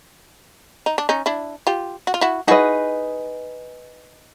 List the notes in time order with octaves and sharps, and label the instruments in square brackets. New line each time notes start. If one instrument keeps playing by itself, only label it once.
[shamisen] D#4
D4
C#4 D#4
D4 E4
F4 G4
F#4
F4
E4 F#4
[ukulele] D#4 G#4 B4 D#5 [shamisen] E4 F#4